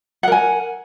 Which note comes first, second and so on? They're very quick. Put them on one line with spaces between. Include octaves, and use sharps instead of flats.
F#5 A#4 G#5